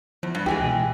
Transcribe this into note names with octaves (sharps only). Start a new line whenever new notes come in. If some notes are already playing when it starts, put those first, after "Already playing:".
E2 F3
G2
C#2 E3 G#3 G4 G#5
B2